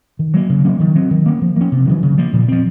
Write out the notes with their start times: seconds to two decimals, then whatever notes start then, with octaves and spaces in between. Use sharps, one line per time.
0.19 D#3
0.34 F#3 A#3
0.50 C#3
0.65 F#3 A#3 C#4
0.80 D#3
0.95 F#3 C4
1.11 D#3
1.26 A#3 C#4
1.41 F3
1.56 A#3 C#4
1.72 C3
1.87 D#3 F#3
2.03 C#3
2.18 F3 A#3
2.33 A#2
2.48 F3 C4